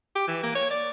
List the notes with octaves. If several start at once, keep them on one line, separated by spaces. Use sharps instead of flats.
G4
E3
A#3
C#5
D5